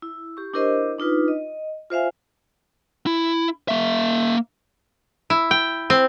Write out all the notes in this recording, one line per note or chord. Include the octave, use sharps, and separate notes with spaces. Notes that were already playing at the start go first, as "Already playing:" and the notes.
E4
G4 C#6
D4 E4 G4 A#4 C5 D#5
D4 D#4 F4 B4
D#5
F4 C5 E5 F5 G#5
E4
A#3 E5
E4
G5
C4